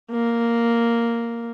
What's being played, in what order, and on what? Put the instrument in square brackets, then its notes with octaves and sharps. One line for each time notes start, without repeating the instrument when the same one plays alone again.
[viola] A#3